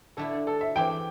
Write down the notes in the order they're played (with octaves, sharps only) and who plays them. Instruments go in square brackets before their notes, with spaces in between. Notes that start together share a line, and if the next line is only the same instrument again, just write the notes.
[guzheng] D3 A3 E4 [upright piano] A4
[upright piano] A4
E5
[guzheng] E2 E3 C4 G4 [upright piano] G5